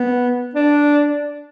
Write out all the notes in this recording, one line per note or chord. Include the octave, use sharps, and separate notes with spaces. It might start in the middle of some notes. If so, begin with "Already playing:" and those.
Already playing: B3
D4